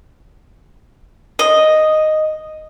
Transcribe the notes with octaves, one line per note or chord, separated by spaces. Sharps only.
D#5